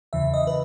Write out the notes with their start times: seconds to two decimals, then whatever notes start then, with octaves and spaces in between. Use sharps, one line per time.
0.13 E2 C#3 E3 E5
0.34 D#5
0.47 B4